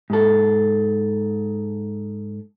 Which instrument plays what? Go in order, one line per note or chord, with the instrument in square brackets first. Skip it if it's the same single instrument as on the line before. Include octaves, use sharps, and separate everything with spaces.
[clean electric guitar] G#2 A4